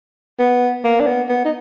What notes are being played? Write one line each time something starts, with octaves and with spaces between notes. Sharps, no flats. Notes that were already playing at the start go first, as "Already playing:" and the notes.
B3
A#3
D4
B3
B3
D#4